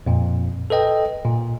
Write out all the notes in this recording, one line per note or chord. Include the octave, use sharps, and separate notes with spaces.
F2 A#2
A4 B4 D#5 G5
A#2